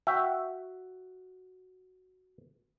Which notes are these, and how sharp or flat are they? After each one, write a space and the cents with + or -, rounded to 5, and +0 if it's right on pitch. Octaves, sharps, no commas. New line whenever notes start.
F#4 +0 E5 +0 G5 -5